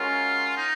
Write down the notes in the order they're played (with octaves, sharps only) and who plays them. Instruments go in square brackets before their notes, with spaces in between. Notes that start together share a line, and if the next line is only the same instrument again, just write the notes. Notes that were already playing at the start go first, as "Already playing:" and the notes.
Already playing: [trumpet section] G#3 C#4 F#4 A#4 [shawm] F4
[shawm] D#4